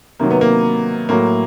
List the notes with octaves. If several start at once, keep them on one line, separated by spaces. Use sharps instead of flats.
C3 D#3 F#3 A#3
B3
A#3
A2 F#3 A#3